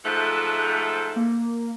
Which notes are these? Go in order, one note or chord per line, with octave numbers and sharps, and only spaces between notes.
G#2 F3 A3 F#6
A#3